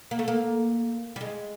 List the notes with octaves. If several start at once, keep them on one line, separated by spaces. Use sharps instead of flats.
A#3
A3
A#3
G3
G#3